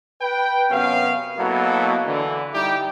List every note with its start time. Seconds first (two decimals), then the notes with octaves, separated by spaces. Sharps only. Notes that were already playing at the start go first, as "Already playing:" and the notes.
0.22 B4 G5
0.71 F#2 C3 B3 C#4 F5
1.38 B2 F#3 A#3 B3 E4 A4
2.07 D3 E3
2.54 G3 D#4 E4 G4